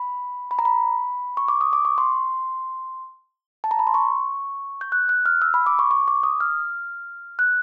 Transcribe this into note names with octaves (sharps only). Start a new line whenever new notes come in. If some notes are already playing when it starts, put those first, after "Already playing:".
Already playing: B5
B5
A#5
B5
C#6
D6
D#6
D6
C#6
C6
A5
A#5
B5
C6
C#6
G6
F#6
F#6
F6
E6
B5
D6
C#6
C#6
D6
D#6
F6
F#6